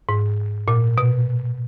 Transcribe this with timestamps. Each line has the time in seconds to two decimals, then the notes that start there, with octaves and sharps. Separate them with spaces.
0.09 G#2
0.68 A#2
0.98 B2